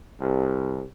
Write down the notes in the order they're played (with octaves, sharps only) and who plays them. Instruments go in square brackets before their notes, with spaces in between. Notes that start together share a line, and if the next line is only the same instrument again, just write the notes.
[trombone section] C2